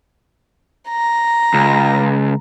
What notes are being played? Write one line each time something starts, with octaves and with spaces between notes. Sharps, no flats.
A#5
C#2